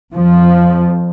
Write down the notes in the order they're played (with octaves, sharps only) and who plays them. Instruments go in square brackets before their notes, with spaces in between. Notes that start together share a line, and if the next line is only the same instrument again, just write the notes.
[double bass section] F2 F3